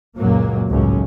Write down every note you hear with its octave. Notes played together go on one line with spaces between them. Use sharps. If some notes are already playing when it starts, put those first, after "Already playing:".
C#2 F#2 A#2 F#3 A#3
G#1 C#2 F#2 A2 C#4